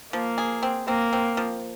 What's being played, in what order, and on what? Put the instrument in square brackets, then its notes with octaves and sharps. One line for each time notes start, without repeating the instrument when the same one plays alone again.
[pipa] F3 [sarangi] A#3
[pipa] G#4
C4
[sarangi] A#3 [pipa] C4
[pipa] C4
F3